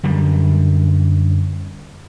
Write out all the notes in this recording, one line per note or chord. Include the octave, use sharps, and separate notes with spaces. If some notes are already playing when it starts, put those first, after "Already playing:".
F#2 D3 G3